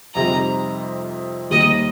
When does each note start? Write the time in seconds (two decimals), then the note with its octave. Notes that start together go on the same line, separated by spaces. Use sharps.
0.15 F2 C3 G3 D#4 A#5
1.50 D#2 D#3 G3 A#3 D#5